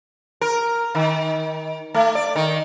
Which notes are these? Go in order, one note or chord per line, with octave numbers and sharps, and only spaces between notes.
A#4
D#3
A3
D5
D#3